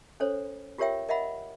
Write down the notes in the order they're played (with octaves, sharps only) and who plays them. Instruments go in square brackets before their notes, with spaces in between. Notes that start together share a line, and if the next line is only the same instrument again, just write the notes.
[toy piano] C#4 A4 C5 C#5
F4 G4 A#4 C#5 E5 G5
A#4 D#5 E5 F#5 B5